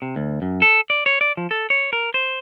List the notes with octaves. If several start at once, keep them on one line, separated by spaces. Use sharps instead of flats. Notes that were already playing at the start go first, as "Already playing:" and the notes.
C3
D2
F#2
A4
D5
C#5
D5
F3
A4
C#5
A#4
C5